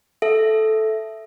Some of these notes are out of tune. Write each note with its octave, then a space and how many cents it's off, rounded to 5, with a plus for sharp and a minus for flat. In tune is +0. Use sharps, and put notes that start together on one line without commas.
A4 -10 E5 +0